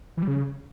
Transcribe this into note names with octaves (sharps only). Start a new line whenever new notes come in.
E3
G3
C#3